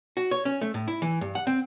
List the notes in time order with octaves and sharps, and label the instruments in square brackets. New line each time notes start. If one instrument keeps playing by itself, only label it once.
[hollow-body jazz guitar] F#4
C#5
C#4
A3
A2
E4
E3
G2
F#5
C4